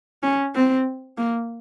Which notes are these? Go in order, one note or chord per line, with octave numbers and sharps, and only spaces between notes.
C#4
C4
A#3